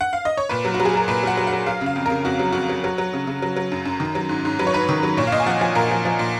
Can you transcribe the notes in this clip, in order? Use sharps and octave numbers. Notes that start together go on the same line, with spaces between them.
F#5
F5
D#5
C#5
A#2 B4
F#3
F#4
F#3
G#4
F#3 A#4
A#2 B4
F#3 F#5
F#3
F#5
F#3
F#3 F5
C#3 F5
F2
C#3 A#4
F2 F#4
F#3
F2 F#4
F#3
F#3
F#3
C#3
C#3
F#3
F#3
F#2
F#2
D#3
F#3
G#2
G#2
F#3 B4
C#5
G#2 B4
D#3
F#3
A#2 C#5
F5
A#2 D#5
G#5
F3 F#5
F3 G#5
A#2 A#4
F3
F3
A#2